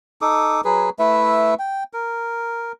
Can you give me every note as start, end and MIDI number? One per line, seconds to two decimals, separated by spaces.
0.22 0.61 63
0.22 0.61 69
0.22 0.61 86
0.22 0.61 87
0.65 0.90 54
0.65 0.90 68
0.65 0.90 71
0.99 1.54 57
0.99 1.54 64
0.99 1.54 71
0.99 1.54 76
1.59 1.84 79
1.93 2.72 70